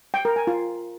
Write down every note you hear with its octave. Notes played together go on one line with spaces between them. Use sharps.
G5
A#4
G#5
F4